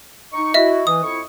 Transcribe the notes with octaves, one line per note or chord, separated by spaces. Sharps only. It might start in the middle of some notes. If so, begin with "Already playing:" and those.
D#4 C#6
E4 F#4 D#5 E5
E3 D#6
F2 E4 C#6